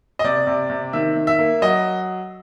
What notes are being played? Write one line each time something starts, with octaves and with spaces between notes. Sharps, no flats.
D#5
C3 D5
C3
C3
D#3 E5
D#3
E5
A#3
F#3 D#5